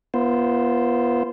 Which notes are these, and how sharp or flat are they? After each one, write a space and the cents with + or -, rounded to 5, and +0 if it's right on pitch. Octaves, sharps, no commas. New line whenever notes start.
B3 -35 F4 -30 C5 +0